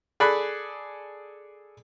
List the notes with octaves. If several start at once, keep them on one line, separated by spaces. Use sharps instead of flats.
G#4 A4 D5 B5 F#6